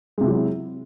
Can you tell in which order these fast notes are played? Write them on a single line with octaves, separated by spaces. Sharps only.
G#3 C3 E4 F#3